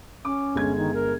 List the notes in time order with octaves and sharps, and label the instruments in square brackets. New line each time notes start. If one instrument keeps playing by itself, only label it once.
[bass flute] C#4 [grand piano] D6
[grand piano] G1 G#3 G#6
[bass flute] D#3
A#4